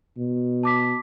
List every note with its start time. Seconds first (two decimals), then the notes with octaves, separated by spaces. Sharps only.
0.17 B2
0.63 A5 D6 B6